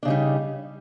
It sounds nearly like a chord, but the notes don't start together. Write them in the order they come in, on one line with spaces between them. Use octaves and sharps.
D4 C#3 D#4 G3